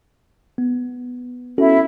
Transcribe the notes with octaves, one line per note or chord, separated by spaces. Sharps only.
B3
C#4 E4 F#4 A4